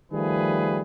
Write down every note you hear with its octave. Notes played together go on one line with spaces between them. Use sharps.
D#3 F3 G3 A3 G#4 B4